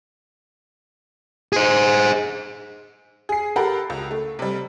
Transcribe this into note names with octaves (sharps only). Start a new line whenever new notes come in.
G#4 C5
G#4 C7
G4 A4 A#4 F#5 A#5 B5
C#2
A3
C3 G3